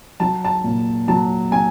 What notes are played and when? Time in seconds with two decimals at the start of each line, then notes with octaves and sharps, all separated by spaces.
0.20 F#3 A5
0.44 A5
0.64 A#2
1.08 F#3 A5
1.51 F#3 G#5